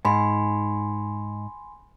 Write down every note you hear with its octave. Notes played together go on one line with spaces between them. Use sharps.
G#2 G#5 B5 C6